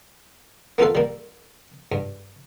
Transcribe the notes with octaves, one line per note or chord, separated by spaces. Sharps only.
A#3 B3 F4 A4 F5
G3 A#3
G2